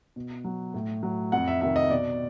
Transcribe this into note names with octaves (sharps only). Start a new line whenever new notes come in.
B2
F#3
A2
F#3
F2 F#5
E5
C3 D#3 E5
D#5
B2 D5